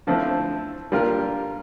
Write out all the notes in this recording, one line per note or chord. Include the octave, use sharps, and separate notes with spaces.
D3 F3 A3 C4 E4
D3 G3 A#3 F4 A#4